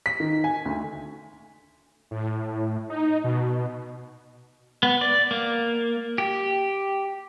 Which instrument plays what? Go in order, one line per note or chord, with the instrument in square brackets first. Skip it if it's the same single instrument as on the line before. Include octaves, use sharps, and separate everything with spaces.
[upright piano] B6
D#3
G#5
D2
[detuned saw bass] A2
D#4
B2
[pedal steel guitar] B3
D5
A#3
G4